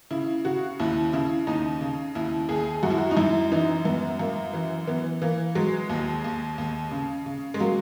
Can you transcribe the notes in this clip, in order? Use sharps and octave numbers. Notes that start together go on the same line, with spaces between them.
C#3 E4
C#3 F#4
D#2 E4
C#3 E4
D#2 D#4
C#3
D#2 E4
D#2 G#4
F#2 F#4
E4
F#4
D#4
F#2 E4
E3 D#4
F#2 B3
F#2 A#3
E3
E3 B3
E3 A#3
F#3 G#3
D#2
D#2
D#2
C#3
C#3
G#3
F#3 A#3